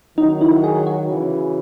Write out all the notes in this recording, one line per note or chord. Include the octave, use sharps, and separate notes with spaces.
D#3 F#3 D#4
E4
G#4
F#4
C#3 E3